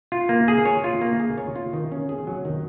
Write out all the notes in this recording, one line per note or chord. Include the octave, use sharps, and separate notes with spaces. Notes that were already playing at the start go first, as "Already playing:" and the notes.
F4
A#3
G#4
C#5
F4
A#3
G#4
C#5
F4
D#3
C#4
G#4
F#3
D#3